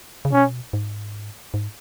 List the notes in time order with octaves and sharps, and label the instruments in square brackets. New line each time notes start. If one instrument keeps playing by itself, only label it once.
[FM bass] C#3
[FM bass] B2 [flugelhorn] C#4
[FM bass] G#2
G#2